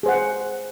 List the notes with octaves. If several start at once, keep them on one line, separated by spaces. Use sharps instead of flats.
G#4 C5 F#5